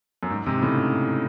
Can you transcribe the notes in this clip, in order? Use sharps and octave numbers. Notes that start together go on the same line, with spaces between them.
F#2
G#2
G#2 C3
A2 C#3